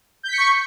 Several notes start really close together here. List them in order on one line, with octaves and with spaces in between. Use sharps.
G6 B6 C#7 C#6